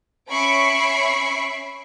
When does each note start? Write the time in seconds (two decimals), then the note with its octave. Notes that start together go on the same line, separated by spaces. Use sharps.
0.31 C#4 E5 B5 C#6 C7 D7